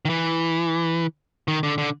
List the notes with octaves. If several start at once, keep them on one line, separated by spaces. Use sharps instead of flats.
D#3
E3
D#3
D3
D3